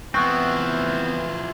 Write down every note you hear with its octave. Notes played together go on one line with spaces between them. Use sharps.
E3 F3 B3 C4 E4 C#6 F#6